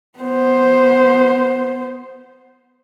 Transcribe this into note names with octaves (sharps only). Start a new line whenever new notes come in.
B3 C5